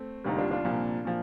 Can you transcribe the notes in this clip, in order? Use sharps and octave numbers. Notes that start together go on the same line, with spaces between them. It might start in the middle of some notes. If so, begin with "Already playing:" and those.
Already playing: A3 C4
F1 D#2 D3 G3 D#4
D4 F4
D4 F4
C2 A#2 F3
A#2 F3